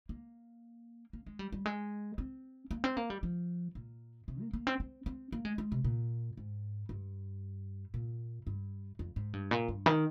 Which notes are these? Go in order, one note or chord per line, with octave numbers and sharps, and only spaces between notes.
A#3
A#3
G#3
G3
G3
G#3
C4
A#3
C4
A#3
G3
F3
A#2
C3
A#3
A#3
C4
C4
C4
A#3
G#3
G#3
C3
A#2
G#2
G2
A#2
G2
F2
G#2
G2
A#2
G2
D#3